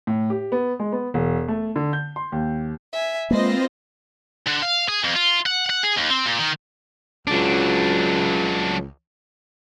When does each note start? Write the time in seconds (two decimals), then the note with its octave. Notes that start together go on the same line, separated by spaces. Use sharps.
0.07 A2
0.30 G4
0.52 B3
0.80 G#3
0.92 B3
1.14 E1
1.48 A3
1.76 D3
1.93 G6
2.16 C6
2.32 D#2
2.92 E5 G#5
3.31 G#3 A#3 C4 F4 B4 C5 D#5 A#6
4.46 D3
4.62 F5
4.89 G#4
5.04 F2
5.16 F4
5.46 F#5
5.70 F#5
5.83 G#4
5.97 D#2
6.10 C4
6.25 A#2
6.38 D#3
7.27 C#2 F#3 D4